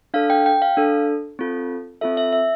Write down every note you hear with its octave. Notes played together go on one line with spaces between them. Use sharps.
D4 A4 F5
G5
G5
F5
D4 A4
C4 F4 A4
C4 F4 A4 E5
E5
E5